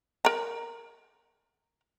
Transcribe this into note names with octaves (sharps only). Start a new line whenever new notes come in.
A#4 A#5